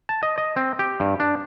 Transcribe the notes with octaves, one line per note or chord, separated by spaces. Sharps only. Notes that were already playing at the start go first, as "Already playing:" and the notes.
A5
D#5
D#5
C4
G4
G2
D4